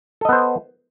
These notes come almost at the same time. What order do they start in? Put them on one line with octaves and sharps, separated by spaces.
A4 D#5 B3 C5